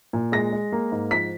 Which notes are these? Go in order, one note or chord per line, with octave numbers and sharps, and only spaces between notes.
A#2
G#3 A#6
G#3
A#3
G#2
F3 B6